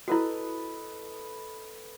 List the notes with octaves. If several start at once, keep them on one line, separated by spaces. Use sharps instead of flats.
E4 F#4 A4 B4 D#5